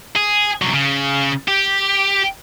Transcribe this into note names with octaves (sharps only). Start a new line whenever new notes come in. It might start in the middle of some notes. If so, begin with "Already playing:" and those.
G#4
C2 F#3
C#3
G4